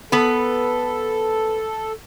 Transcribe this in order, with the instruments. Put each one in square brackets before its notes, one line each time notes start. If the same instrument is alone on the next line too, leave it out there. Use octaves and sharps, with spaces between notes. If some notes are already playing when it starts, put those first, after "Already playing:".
[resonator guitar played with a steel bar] B3 B4 [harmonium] A4